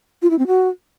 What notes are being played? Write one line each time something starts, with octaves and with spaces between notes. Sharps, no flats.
F4
E4
C4
F#4